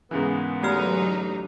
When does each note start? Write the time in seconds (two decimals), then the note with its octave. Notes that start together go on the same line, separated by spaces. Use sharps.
0.11 G#2 C#3 E3 G#3 A#3 B3
0.63 D3 F#3 A3 D#4 G4 F6